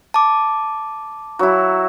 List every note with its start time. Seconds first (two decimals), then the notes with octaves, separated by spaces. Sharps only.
0.14 A5 D6
1.39 F#3 E4